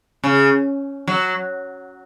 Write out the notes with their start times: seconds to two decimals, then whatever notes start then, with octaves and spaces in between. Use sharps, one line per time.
0.24 C#3
1.07 F#3